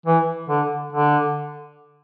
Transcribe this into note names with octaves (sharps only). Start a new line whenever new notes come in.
E3
D3
D3